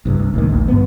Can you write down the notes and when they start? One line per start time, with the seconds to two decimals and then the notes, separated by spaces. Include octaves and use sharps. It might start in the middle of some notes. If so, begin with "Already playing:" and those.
0.05 C2 G2
0.20 C2
0.34 D2 A#2 D#3
0.49 A1 D2
0.68 G2 B3